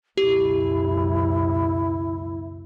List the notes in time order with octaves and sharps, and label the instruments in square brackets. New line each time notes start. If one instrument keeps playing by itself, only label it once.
[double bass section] C#2 F#2 B2 [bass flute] E4 [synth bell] G4